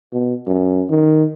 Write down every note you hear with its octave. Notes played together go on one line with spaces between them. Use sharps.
B2
F#2
D#3